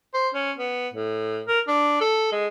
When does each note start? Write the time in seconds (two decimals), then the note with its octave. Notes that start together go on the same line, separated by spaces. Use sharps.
0.14 C5
0.34 C#4
0.58 B3
0.94 A2
1.48 A#4
1.68 D4
2.01 A4
2.32 G#3